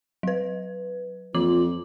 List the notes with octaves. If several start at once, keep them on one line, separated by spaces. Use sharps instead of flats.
F#3 B4
F2 E3 F4 D6 F#7